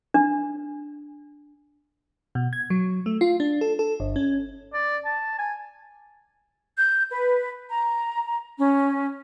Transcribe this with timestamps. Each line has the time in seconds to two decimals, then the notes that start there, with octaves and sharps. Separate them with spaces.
0.14 D4
2.35 B2
2.53 G#6
2.70 F#3
3.06 A3
3.21 F4
3.40 D4
3.61 A4
3.79 A4
4.00 G1
4.16 C#4
4.74 D5
5.05 A5
5.39 G#5
6.76 G6
7.12 B4
7.70 A#5
8.58 C#4